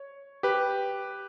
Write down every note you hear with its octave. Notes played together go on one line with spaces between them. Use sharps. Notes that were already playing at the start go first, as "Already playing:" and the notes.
Already playing: C#5
G4 B4